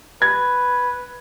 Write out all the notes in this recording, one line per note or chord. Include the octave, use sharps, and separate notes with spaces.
B4 G#6